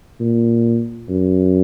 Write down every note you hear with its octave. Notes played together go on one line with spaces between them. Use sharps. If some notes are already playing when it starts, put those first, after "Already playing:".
A#2
F#2